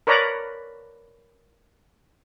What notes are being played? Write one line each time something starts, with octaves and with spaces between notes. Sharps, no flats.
A#4 B4 C#5 D5 A#5